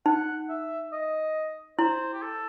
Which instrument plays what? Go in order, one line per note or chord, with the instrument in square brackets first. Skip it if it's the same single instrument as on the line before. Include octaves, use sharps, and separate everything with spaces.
[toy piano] D#4 [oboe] F#5
[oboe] E5
D#5
[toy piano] E4 [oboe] C5
[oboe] G4
A4